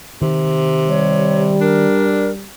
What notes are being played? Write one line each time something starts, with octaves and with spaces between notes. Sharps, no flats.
C3 D#3
G3 C#5
D4 A#4